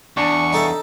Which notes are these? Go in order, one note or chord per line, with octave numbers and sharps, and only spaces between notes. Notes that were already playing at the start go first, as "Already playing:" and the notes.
E2 D4 C#6
D#4 A4 E5